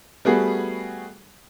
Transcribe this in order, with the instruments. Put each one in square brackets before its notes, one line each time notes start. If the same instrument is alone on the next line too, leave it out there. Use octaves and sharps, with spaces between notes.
[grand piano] G3 A3 B3 F#4 G#4